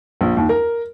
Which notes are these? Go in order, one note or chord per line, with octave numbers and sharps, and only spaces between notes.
A#1
D#2
A#4